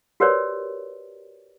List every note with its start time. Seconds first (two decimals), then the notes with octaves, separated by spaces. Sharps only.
0.20 F#4 G4 A#4 B4 C#5 D5